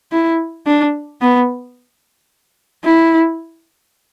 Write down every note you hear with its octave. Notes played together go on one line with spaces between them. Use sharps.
E4
D4
B3
E4